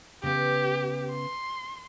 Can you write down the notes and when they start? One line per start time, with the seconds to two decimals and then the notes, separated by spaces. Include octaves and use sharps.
0.23 C#3 B3 G4
1.11 C6